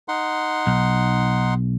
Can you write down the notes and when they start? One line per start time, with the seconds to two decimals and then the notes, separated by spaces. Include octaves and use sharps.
0.08 D#4 F#5 C6
0.67 B1